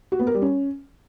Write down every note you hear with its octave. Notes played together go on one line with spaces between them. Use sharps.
F#4
B3
A#4
G3
C#4